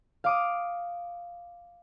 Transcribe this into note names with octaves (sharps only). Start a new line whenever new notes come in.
F5 D6 D#6